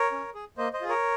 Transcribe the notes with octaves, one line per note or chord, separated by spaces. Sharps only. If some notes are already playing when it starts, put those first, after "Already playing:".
Already playing: A#4 C#5
C#4
G#4
A#3 C5 D#5
C5 D#5
F4 G#4
A#4 C#5